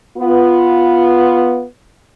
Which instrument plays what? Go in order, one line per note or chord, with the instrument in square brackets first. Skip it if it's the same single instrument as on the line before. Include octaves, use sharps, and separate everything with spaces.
[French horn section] B3 F4